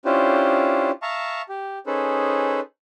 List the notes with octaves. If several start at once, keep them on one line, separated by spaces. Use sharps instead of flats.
C#4 D4 E4 F4 G4 C5
E5 F5 A5 A#5 C#6
G4
C#4 D#4 G#4 A4 B4 C5